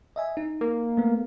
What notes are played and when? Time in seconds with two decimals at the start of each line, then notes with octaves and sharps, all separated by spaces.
0.16 D#5 E5 G#5
0.37 D#4
0.61 A#3
0.97 A3 B3